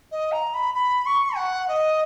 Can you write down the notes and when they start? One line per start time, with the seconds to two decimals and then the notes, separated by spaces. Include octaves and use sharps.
0.11 D#5
0.32 A#5
0.54 B5
0.74 B5
1.06 C#6
1.36 F#5
1.68 D#5